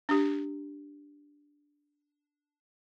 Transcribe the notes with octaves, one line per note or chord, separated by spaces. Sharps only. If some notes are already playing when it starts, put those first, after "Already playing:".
D4 G4